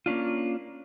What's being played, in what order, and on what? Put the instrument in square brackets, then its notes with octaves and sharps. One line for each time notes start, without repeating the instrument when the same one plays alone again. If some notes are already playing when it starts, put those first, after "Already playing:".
[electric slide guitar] A#3 C#4 D4 F4